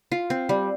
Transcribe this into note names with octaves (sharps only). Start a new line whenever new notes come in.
F4
C4
G3